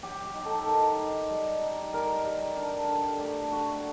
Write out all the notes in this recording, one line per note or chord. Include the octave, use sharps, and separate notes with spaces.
F#3 G4
G4
D#4
A4
D#4 A#4
D#4
G3
D#4
G3 A#4
G3
D4
D3
A3 G4
D3 F#4